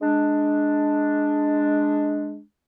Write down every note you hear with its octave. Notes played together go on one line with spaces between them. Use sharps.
G#3 D4